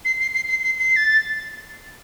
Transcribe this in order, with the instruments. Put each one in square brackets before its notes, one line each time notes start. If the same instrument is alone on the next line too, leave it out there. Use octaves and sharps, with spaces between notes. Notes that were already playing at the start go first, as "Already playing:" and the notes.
[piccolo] C7
C7
C7
C7
C7
C7
A6